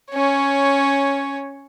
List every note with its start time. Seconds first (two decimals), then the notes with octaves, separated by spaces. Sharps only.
0.11 C#4 C#5